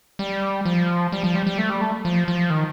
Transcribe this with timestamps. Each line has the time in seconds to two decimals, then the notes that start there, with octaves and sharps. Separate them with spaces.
0.19 G3
0.65 F3
1.12 G3
1.24 F3
1.35 G3
1.47 G3
1.58 A3
1.70 G3
1.81 A3
2.05 F3
2.28 F3
2.50 D#3